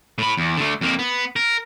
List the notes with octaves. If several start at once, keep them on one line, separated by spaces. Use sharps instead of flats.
A2 B5
E2
D3 A3
F2 A#3
B3
A#4